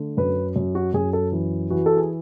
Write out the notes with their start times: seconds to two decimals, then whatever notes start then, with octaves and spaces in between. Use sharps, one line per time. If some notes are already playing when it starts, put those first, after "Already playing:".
Already playing: D3 A3
0.17 F#2 B4
0.56 F#2
0.75 F#4
0.94 F#2 G#4
1.13 A4
1.32 E3
1.70 E3 F#4
1.86 A4
1.97 G#4